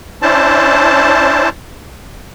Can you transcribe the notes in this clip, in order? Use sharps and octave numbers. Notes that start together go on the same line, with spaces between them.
C#4 D4 E4 C5 A5